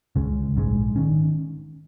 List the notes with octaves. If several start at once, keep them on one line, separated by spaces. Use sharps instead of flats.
C#2 C#3 G#3
A#1 G#2 D#3 G#3
D#3 C#4